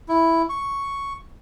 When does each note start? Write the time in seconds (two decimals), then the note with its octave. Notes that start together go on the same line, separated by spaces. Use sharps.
0.08 E4
0.50 C#6